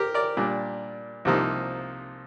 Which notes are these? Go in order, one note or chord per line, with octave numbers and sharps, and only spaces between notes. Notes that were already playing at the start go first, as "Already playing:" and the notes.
Already playing: G4 A#4
A#4 D5
A#2 G3 D4
C2 C3 F3 A#3 D#4